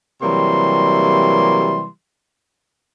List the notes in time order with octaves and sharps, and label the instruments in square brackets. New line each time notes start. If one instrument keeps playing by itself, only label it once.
[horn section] C3 E3 F#3 G3 A#3 C6